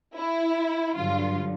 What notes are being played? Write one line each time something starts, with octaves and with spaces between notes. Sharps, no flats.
E4
G2 D3 F#3 F4